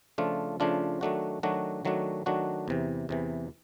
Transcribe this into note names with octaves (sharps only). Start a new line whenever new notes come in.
C#3 F3 A3 D4 F4
C#3 F3 A3 D4 F4
D#3 F#3 A3 D4 F#4
D#3 F#3 A3 D4 F#4
D#3 F#3 A3 D4 F#4
D#3 F#3 A3 D4 F#4
E2 C3 E3
E2 C3 E3